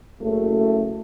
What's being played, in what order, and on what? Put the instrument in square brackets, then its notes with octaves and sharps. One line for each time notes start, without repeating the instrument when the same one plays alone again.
[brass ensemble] F#1 A3